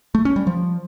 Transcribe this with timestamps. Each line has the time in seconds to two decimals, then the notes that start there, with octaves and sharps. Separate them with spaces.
0.15 A3
0.25 C#4
0.36 G3
0.47 F3